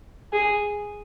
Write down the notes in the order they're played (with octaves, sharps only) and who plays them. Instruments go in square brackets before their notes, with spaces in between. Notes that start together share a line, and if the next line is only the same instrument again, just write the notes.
[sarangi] G#4